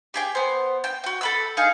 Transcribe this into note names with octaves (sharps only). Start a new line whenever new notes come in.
G4 G#4 G5
B3 C5
G5
F#4 G5
A4 B5 E6
D#4 G#4 F5